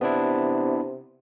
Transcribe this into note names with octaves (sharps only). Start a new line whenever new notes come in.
C3 B3 D4 E4